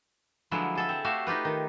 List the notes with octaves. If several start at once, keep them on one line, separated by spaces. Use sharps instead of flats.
D3 F3 F#3 G#3 B3 E4
G#4 A4 E5
C4
A3 F#4 G4 E5 F5
D#4 F4 G4 B4
D#3